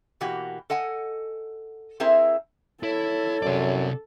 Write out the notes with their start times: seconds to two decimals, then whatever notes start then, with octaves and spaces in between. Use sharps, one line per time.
0.21 B2 E3 A#3 F#4 G4
0.70 A4 D#5 F#5 G#5
2.00 C4 E4 G#4 A#4 C5 E5
2.83 E4 A4 C#5
3.43 F#2 C3 D5